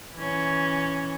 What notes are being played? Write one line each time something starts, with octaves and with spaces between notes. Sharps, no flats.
E3 C#4